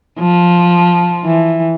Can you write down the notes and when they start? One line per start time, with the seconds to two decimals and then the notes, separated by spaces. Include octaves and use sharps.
0.20 F3
1.26 E3